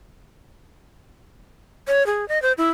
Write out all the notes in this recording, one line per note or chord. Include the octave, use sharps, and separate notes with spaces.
C#5
G#4
D#5
C5
E4